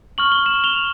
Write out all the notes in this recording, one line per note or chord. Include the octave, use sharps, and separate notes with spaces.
C#6 F6 F#7
G7
E7 F#7
F7 G7